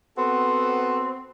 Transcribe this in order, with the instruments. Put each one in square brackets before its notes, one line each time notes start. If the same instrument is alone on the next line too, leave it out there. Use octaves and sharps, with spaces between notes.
[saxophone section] B3 C4 F#4 A4